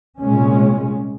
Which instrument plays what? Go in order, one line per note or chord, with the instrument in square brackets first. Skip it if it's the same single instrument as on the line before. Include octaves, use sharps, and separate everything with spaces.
[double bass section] C2 A#2 G#3 C#4